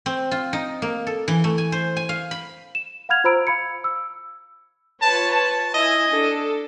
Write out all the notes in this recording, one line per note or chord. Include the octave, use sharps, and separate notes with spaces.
C4
F4
D#4
A#3
A4
E3
A3
G#5
C5
G#5
F5
B5
E7
F5 F#5 B5 F6 G#6 F7
F4 C5 A#5 B5 E6 D7
F5 B5 G#6 C#7
E6
F4 B4 C#5 A5
A5
E4 D#5 E5 G#5
D4 A4